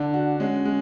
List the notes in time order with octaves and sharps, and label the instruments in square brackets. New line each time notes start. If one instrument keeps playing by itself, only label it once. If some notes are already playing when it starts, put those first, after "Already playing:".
Already playing: [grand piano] D3 [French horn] D4
[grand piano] F#4
[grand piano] G#3 [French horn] C#4
[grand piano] G#3